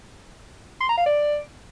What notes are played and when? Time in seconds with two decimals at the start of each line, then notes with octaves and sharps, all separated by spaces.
0.80 C6
0.89 A#5
0.98 F5
1.06 D5